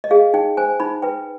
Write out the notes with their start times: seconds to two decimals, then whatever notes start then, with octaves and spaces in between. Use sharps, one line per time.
0.04 D#5
0.11 G#4 F5
0.34 D#4 G5
0.57 C5 G#5
0.80 D#4 B5
1.02 B4 G5